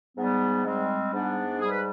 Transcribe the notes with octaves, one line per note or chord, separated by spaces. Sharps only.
G#2 G3 B3
G3 G#3 C4
G#2 B3 D4
G3 G#4
B4